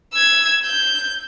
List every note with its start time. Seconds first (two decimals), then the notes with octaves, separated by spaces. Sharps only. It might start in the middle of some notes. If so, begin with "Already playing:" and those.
0.14 E6 G#6
0.65 G6